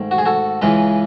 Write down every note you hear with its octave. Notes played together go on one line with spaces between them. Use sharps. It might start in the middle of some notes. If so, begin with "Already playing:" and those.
Already playing: G#2 D#3 A3
F#4
G#4
F#4 A4
C#2 C#3 E3 G#3 B4 D#5